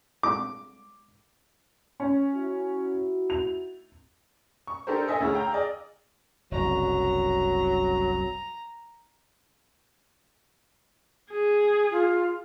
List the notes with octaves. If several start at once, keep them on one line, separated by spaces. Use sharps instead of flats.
D6
C#4
D#4 E4 F#4
F7
C#6
D4 D#4 G4 A4 A#4 C5
A4 D#5 E5 G#5 E6
D2 E4 G#4 C#5 F6
F5 G5 A#5
G#4 D5 D#5
F#1 C2 F#3 A#5
G#4
F4